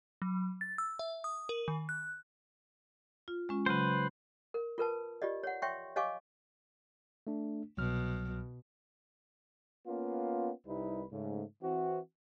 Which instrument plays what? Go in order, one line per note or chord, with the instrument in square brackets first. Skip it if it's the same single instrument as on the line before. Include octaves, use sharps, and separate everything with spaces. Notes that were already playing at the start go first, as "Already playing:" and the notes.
[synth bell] F#3
A6
E6
E5
D#6
A#4
D#3
F#6
[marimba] F4
G#3 C#4 F4
[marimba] C#3 F#3 [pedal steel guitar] B4 C5
[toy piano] A#4
F4 A#4 B4 A5
F4 G4 D5 D#5
C#5 F#5
C#5 E5 G5 C6 C#6
C#5 D#5 F5 G#5 C#6 D6
[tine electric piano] A3 D4
[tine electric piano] C2 F#3 F6 [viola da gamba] B2
[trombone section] A#3 B3 C#4 F4
C2 C3 G3 D#4 E4 B4
G#2 C#3 A3
E3 C4 F#4